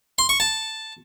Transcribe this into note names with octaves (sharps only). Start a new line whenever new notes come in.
C6
C#6
A5